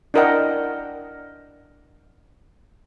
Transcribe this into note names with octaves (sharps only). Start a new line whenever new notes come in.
D4 E4 A#4 D#5 F#5 G5